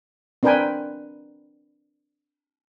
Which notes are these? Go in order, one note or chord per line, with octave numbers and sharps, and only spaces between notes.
C4 D4 A#4 B4 G5 G#5